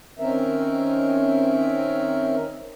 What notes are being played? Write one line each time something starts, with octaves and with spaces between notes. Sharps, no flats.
D#3 C4 C#4 A#4 E5